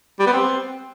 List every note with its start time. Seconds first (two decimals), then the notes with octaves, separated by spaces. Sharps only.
0.20 G3
0.26 B3
0.33 C4